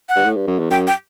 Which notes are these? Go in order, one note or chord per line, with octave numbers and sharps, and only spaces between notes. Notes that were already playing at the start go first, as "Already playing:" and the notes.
F#5
G2
A2
G2
F#2
E2
F#2 G5
G5